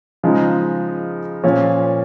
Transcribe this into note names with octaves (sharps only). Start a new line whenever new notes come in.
C#3 F3 G#3 D#4
A#2 F3 C#4